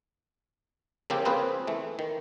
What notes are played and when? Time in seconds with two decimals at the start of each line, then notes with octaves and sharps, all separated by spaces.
1.10 C#3 F3 A#3 C4 F4 G4
1.25 C#3 A#3 C4 F4 G#4 B4
1.67 E3 A3
1.99 D#3